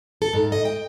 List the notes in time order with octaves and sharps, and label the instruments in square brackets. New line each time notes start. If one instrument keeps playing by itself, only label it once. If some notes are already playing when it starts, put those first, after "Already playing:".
[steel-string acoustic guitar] A4
G#2
D#5
G5